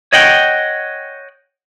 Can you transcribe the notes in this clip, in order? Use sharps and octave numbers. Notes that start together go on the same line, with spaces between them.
C#5 D#5 F#5 G5